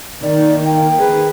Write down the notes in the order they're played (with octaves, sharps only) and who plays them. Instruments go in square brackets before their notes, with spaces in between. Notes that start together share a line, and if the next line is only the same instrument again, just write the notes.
[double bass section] D#3 A#3 [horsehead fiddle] D#4 [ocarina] D5
[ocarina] G5
[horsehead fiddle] G#4 B4